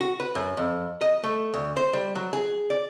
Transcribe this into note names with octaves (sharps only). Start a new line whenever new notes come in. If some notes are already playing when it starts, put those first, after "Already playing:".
F#4
B4
F#2
F2
D#5
A3
D2
C5
G3
F#3
G#4
D5